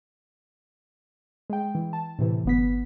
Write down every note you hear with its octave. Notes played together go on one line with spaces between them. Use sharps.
G#3 G5
E3
A5
A2 C3 E3
G1 B3 B6